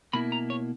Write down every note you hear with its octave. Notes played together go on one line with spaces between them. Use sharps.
B2 A#3 E4 B5
A#5
C#5